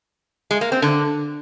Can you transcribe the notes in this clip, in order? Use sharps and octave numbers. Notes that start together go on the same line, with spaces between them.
G#3
A#3
C4
D3